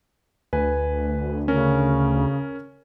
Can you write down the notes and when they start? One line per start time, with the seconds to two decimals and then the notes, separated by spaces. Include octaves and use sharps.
0.53 D2 B4 G#5
1.48 C#3 C#4 A#4